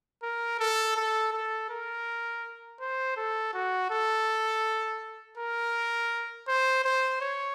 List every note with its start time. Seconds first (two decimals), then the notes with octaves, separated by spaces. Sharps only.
0.23 A#4
0.60 A4
0.96 A4
1.33 A4
1.70 A#4
2.80 C5
3.17 A4
3.54 F#4
3.91 A4
5.38 A#4
6.48 C5
6.84 C5
7.21 C#5